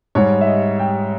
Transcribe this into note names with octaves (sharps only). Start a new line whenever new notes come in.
G#2 G3 C#5
E5
D#5
G5